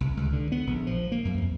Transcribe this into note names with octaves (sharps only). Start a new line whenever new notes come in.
C2
C#2
D3
B3
A#1
F3
A#3
F#2
F2